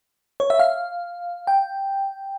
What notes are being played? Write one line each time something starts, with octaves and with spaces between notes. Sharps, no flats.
C#5
E5
F5
G5